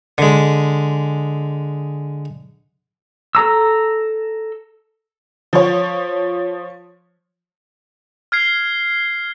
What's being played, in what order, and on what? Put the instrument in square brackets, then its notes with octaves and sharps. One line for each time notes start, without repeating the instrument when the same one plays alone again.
[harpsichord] D3 G#3
[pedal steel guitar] A4 A#5 E6
[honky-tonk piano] F3 C#5
[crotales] F6 G#6 C7